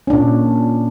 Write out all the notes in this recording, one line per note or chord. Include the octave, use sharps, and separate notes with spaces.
A#2 C#4 D4